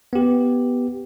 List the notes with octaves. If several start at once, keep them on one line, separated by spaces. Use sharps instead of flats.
B3 G4